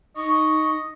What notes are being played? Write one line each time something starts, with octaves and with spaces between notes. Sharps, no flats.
D#4 D#5 C#6